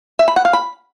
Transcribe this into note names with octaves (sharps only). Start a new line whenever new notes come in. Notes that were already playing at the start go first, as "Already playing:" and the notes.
E5
B5
F#5
F5
B5